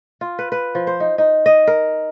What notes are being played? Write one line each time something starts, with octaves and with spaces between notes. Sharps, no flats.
F4
B4
B4
F3
C5
D#4
D#4
D#5
A#4